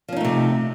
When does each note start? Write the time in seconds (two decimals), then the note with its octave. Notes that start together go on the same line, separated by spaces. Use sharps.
0.08 F3
0.12 C#4
0.17 D#4
0.21 A3
0.25 C3